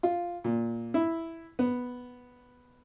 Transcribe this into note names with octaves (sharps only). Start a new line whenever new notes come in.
F4
A#2
E4
B3